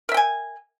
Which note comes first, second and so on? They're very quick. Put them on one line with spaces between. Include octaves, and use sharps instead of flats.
A#4 E5 G5 G#5